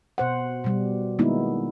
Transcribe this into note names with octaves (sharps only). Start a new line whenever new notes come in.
B2 C5 F#5
B2 G3
D#3 G#3 A#3 B3 D#4 E4